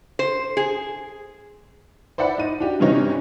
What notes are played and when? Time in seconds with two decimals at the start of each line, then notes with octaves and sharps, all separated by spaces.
0.19 C5
0.57 G#4
2.18 C5 D5 E5 F#5 B5
2.38 D#4 D#7
2.60 D4 F#4 G4
2.80 G2 C3 E3 C4 C#4 D#4